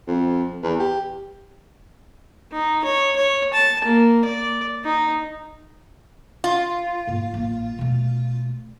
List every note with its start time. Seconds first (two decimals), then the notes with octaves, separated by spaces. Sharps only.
0.08 F2
0.63 E2
0.79 G4
2.52 D#4
2.84 C#5
3.16 C#5
3.53 A5
3.84 A#3
4.25 D5
4.84 D#4
6.44 F4
7.08 G#2 A#3
7.34 A1 A#3
7.79 B2 A3